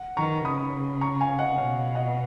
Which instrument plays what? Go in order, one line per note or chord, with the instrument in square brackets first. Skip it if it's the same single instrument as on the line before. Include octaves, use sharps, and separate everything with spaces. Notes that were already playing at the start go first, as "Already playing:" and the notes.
Already playing: [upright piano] F#5
[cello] D#3 [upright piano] A#5 C#6
[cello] C#3 [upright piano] B5 D#6
[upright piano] A#5 C#6
F5 G#5
D#5 F#5
[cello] B2 [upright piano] C#5 F5
[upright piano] D#5 F#5